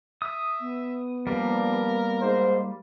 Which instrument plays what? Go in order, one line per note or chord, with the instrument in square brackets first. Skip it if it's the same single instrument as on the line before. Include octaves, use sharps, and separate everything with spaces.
[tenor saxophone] E5 [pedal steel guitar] D#6
[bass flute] B3
[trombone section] G2 F3 [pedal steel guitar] G3 A#3 [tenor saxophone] A#4
[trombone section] G#2 C5